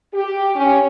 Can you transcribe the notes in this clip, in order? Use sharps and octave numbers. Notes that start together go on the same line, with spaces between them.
G4
C#4